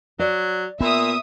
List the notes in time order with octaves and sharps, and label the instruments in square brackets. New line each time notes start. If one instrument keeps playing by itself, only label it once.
[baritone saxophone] F#3 [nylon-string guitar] D5
[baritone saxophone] A#2 [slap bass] B3 [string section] E5 D#6